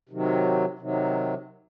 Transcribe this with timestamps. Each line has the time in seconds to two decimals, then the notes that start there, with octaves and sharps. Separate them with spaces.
0.09 C3 D#3 F#3
0.79 C3 D#3 F#3